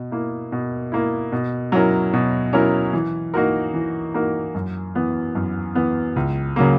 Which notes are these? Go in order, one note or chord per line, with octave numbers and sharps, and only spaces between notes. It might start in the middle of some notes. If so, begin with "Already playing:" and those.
Already playing: B2
A#3 E4
B2
A#3 E4
B2
F#3 C#4 E4 A#4
B2
F#3 C#4 E4 A#4
E3
A#3 D#4 F#4 A#4
E3
A#3 D#4 F#4 A#4
F#2
E3 B3
F#2
E3 B3
C#2
C#3 F#3 A#3